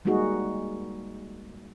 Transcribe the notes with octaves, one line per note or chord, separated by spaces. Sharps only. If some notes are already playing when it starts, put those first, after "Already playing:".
G3 G#3 A#3 D#4 F#4 G#4